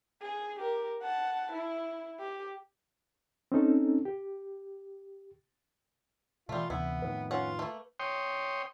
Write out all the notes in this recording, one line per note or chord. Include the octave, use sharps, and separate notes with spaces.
G#4
G4 A#4
F#5 A5
E4
G4
C4 C#4 D#4 A4
G4
B2 E3 G3 A3 F4
D2 C3 E3 B3 E4
F2 A2 D#3 B4
C#4 F4 F#5
A3 A#3
C#5 G5 C6 D#6